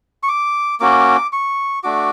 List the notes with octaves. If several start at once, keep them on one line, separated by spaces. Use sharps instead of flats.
C#6
D6
A#3 C#4 F#4 D6
C#6
A3 D4 F#4 D6